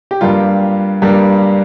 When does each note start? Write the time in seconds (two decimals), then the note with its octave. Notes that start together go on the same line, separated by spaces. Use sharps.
0.11 G4
0.21 G2 G3 A#3 F4
1.02 G2 G3 A#3